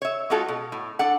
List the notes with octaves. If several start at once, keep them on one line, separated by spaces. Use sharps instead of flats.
C#5 E5
G#3 C#4 F4 F#4 A4
B2
A2
D4 A4 F#5